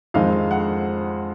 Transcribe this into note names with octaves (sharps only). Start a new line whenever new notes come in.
F2 D#3 G#3 D#4 F5
F#5